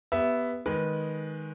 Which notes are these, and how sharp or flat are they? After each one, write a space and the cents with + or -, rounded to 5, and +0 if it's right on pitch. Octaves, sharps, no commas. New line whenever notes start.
B3 +0 G4 +0 E5 +0
D#3 +0 G#3 +0 B4 -10